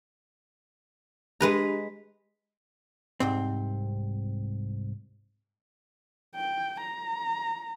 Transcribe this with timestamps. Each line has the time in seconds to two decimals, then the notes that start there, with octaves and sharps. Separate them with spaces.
1.41 G#3 D4 G4 B4 A#5
3.20 C2 G#2 C4
6.36 G5
6.81 A#5